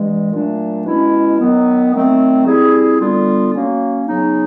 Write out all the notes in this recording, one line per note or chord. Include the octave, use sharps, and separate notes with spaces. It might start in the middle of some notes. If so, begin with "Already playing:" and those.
Already playing: G2 E3 G#3
A#2 F#3 A3 D4
B2 G#3 C#4 E4
D#3 F#3 B3
D#3 F#3 A3 C4
G3 C4 E4 G#4
D3 G3 B3 D4 F4
F#3 A#3 C#4
C#3 F#3 B3 D#4